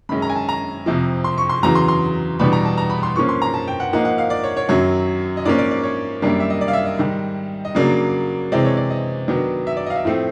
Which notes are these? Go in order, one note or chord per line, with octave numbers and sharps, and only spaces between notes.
F#2 D#3 G#3 C#4 B5
A#5
G#5
A5
A#5
F2 C3 F3
C6
C#6
C6
E2 C#3 F#3 A#5
C6
C6
E2 B2 G3 B3 D4 B5
A#5
A5
A#5
B5
C6
G#2 F3 A#3 C#4 C#6
C6
A#5
A5
G5
F#5
G#2 F3 A#3 D#4 F#5
F#5
F5
D5
C#5
C#5
F#2 D#3 F#3 C#5
D#5
G#2 F3 A#3 C#4 D5
D5
D5
C#5
F#2 D#3 G3 A#3 D4
E5
D#5
D5
F5
E5
D#5
G#2 D#3 G3
D#5
C#3 F#3 A#3 D4 D5
C3 E3 G#3 C4 D5
C#5
D5
D#5
D#3 F#3 B3 D4
E5
D5
D#5 F5
E5
A2 F3 A3 C4